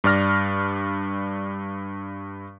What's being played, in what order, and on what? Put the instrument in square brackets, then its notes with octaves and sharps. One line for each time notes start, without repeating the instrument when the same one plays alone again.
[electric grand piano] G2 D5 F6 A#6